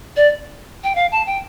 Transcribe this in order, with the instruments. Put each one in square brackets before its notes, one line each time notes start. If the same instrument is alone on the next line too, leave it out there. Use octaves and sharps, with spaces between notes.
[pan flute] D5
G5
F5
A5
G5